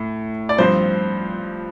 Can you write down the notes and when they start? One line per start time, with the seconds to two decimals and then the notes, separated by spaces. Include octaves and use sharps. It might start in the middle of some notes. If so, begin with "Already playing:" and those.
Already playing: A2
0.49 D5
0.58 G2 F3 C4 C5